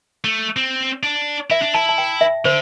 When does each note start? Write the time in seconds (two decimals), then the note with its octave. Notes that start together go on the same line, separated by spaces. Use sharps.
0.24 A3
0.57 C4
1.03 D4
1.50 E4 E5
1.62 D4
1.74 E4 A5
1.89 A5
1.98 G5
2.21 E5
2.45 D3 C5